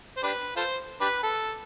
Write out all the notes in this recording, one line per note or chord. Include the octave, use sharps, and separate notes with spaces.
C5
D4 G4 B4
F4 A4 C5
D4 G4 B4
A4